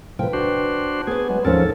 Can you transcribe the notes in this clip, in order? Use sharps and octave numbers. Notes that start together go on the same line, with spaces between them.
A2 C3 F3 B4 G5
D4 F#4 C5
B3 G#4 B4
F#3 G#3
D#2 G#2 F3 C#4 A4 A#4